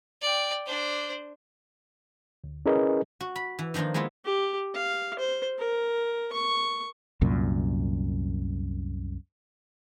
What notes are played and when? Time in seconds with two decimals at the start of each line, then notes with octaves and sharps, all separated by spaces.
0.21 D5 G5
0.66 D4 C5
2.44 D2
2.66 C#4 E4 G#4 A#4 B4 D#5
3.21 F#4
3.36 B5
3.59 E3
3.74 D#3 F3 A#3 D4 F4
3.94 G#3 A#3 B3 E4 F4
4.25 G4
4.75 F5
5.19 C5
5.59 A#4
6.33 C#6
7.22 C2 F#2 A#2